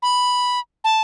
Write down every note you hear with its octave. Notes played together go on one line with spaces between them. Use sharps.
B5
A5